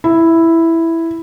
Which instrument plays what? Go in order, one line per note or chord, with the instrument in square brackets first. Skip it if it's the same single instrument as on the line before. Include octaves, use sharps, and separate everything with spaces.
[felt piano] E4